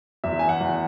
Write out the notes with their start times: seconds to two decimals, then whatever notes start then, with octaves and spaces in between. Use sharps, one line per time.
0.24 E2 E5
0.39 G#5
0.49 F#5
0.61 E2